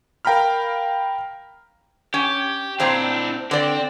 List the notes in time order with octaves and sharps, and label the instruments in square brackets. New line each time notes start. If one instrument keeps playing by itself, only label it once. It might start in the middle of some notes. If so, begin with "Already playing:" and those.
[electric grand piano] A#4 F5 G5 A#5 B5 F6
[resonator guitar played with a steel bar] C#4 [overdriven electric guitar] G4
[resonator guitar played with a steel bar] A#2 C4 A#5 [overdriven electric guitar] D4 E4
[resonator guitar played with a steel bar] D3 D5 [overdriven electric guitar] C4